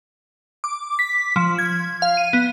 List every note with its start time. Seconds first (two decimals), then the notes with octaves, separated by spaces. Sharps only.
0.64 D6
0.99 B6
1.36 F3
1.58 G#6
2.02 F5
2.17 D#7
2.33 B3